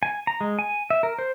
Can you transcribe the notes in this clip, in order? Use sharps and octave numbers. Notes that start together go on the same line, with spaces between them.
G#5
A#5
G#3
G#5
E5
A#4
C5